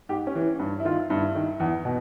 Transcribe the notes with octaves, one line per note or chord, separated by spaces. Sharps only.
G#2 G4
C#4
E3
G2
E4
D#3 F4
G2 E4
D#3
E2
B2